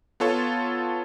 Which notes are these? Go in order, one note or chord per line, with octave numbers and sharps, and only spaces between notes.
B3 F4 A4 C#5 A5